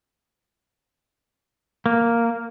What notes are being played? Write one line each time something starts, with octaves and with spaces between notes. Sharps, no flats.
A#3